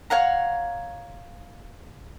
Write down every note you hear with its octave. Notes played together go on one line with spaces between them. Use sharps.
C#5 F5 F#5 A#5